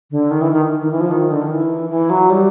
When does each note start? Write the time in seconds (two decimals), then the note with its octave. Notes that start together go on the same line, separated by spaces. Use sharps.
0.11 D3
0.31 D#3
0.41 E3
0.52 D#3
0.82 D#3
0.92 E3
1.00 F3
1.11 D#3
1.31 D3
1.42 D#3
1.51 E3
1.90 E3
2.10 F#3
2.30 G3